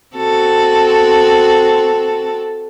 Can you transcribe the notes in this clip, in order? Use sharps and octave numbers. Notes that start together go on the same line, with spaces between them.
C4 F#4 A4